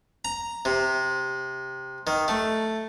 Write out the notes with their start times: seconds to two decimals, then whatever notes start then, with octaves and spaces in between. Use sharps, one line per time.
0.25 A#5
0.65 C3
2.07 D#3
2.28 A3